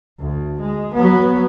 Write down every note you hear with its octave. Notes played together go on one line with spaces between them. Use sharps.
D2
G#3
F#3 B3